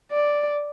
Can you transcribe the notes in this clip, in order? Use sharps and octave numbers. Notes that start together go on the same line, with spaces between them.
D5